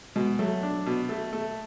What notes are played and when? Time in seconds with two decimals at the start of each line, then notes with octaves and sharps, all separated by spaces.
0.16 B2 G#3
0.39 F#3 A3
0.63 D4
0.86 B2
1.09 A3
1.33 A3